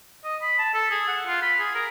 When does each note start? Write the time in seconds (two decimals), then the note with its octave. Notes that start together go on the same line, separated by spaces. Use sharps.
0.24 D#5
0.42 B5
0.59 A5
0.74 A4
0.91 G#4
1.08 F#5
1.27 F4
1.42 B5
1.60 G#4
1.75 A#4